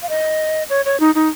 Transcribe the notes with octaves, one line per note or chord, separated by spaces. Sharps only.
F5
D#5
C#5
C#5
D#4
D#4